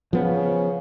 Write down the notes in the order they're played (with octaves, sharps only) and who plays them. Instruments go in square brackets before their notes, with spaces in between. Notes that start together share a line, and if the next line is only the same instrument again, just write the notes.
[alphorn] C#3 [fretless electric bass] F3 B3